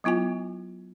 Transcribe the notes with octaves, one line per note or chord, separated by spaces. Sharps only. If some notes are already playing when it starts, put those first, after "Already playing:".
F#3 B3 E4 F4 G#5